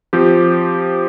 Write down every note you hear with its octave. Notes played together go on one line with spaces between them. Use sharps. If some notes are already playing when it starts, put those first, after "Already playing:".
F3 C4 G4